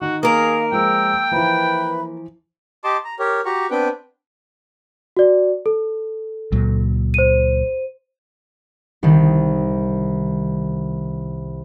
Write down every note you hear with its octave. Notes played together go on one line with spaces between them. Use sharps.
D#3 F#4
A#3 G#4 A#4 F5
F3 G#3 G5 E6
E3 F3 B4 E5 B5
G4 D#5 A5 C6 D6
A#5
G4 A#4 C#5
F#4 G4 A#5 C#6
B3 C4 D4 B4 G5
F#4 D5
A4
C#2 A#2 F#3
C5 D#7
C2 D#3